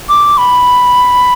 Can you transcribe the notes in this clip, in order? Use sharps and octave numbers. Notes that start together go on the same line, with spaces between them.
D6
B5